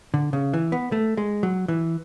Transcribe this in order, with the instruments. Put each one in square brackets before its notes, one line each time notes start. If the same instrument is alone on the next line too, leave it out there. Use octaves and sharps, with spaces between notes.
[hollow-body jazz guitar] D3
C#3
E3
B3
A3
G#3
F#3
E3